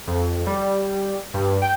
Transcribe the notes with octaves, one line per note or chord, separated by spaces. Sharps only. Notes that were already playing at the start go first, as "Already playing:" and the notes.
F2
G3
G2
G5